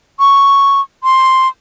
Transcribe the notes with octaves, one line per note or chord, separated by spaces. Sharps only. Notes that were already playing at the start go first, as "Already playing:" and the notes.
C#6
C6